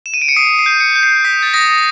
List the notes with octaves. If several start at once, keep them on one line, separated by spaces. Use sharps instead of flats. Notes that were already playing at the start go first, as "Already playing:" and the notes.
E7
D#7
D7
C#7
D#6 C7
C7
G6
C#7
G6
C7
D#6 B6
A6
D#6 A#6